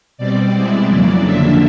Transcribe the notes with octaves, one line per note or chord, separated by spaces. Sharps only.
B2 G3 C4 D5
B2 G#3 C4 E4
F2 C#3 F#3 A#3 D5
D3 F3 A#3 D4 E5